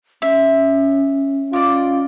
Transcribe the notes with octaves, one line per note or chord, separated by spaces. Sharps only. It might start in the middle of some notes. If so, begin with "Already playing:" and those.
C#4 E5
F4 D5 D#5 D6